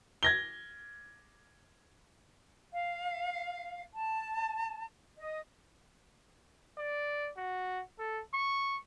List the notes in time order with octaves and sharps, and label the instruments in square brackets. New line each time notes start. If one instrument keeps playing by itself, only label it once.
[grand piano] G#6 A#6 G7
[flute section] F5
A5
D#5
[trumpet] D5
F#4
A4
C#6